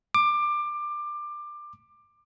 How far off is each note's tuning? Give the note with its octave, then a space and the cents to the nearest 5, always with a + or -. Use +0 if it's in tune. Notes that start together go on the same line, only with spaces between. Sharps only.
D6 +20